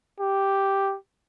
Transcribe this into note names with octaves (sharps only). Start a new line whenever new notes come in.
G4